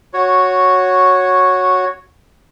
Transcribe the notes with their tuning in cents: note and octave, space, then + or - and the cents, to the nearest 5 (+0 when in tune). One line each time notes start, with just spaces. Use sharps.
F#4 -10 C#5 +0